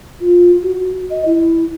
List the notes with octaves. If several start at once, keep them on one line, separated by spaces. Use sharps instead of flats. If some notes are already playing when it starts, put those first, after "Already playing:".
F4
F#4
D#5
E4